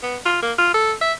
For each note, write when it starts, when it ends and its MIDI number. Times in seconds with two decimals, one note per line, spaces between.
0.03 0.17 59
0.26 0.38 65
0.42 0.52 58
0.58 0.71 65
0.74 0.93 69
1.01 1.13 76